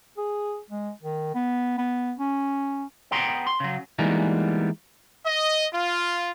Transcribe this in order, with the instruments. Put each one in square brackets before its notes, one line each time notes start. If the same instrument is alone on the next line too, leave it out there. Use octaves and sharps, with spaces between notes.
[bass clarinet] G#4
G#3
D#3
B3
B3
C#4
[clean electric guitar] B3 G#4 G5 A#5 C6
C6
C#3 F#3
E3 G3 G#3 A#3 B3 D#4
[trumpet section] D#5
F4